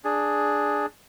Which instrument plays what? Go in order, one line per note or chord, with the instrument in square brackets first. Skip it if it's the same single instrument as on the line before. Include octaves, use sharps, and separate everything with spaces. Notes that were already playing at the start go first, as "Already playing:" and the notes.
[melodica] D4 G#4